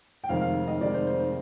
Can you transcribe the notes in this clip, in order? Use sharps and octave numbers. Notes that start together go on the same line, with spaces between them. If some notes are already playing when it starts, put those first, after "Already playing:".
G5
F1 F2 D#3 G#3 F5
F5
D#5
F1 F2 D#3 G#3 D5
C5
C5
C5